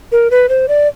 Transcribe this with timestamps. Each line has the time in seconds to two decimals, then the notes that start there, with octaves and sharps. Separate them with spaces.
0.12 A#4
0.31 B4
0.49 C5
0.68 D5